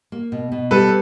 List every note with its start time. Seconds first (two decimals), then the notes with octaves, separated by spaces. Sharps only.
0.12 A#3
0.32 B2
0.52 B2
0.71 G3 A4 B4